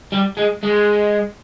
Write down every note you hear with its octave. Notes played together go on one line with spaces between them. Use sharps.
G3
G#3
G#3